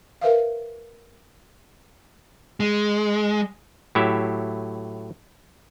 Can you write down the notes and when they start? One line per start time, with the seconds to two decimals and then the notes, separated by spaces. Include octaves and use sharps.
0.21 A#4 B4 E5 F5
2.60 G#3
3.95 A2 F#3 E4 G4 E5